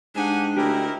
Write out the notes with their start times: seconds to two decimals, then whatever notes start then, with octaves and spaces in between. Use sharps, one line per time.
0.15 G#2 D4 G4 F#5 G#5
0.56 D2 D#4 E4 G4 A#4